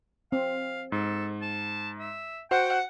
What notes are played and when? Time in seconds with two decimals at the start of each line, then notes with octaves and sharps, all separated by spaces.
0.32 C4 F5
0.92 G#2 A4
1.42 A5
1.99 E5
2.51 F#4 C5 F#5 G5